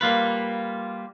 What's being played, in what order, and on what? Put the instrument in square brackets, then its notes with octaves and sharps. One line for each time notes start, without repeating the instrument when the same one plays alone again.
[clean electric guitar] G3 A#3 F4 B4